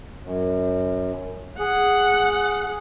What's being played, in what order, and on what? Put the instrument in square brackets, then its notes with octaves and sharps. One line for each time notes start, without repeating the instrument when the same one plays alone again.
[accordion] F#2
[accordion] G#4 [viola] F#5